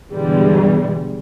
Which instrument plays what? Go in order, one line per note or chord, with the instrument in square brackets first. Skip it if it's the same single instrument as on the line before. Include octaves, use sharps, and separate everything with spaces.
[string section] G2 B2 D3 E3 G3 G#3